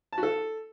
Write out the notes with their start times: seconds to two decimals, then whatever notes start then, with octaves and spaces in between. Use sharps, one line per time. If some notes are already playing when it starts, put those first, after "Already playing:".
0.13 A5
0.18 F#4
0.23 A4